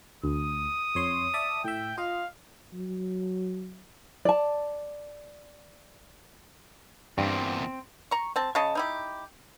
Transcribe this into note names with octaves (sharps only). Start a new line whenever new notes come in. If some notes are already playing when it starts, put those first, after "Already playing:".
D2 D#6
F2 C#5 C6
D5 E5 A5
A2 E5 G5
F4 D#5 F5
F#3
D5 A5
E2 G2 A#2 C4
A#5 C#6
C4 A5
C#3 C#5 D#5 A5
D#4 E4 G4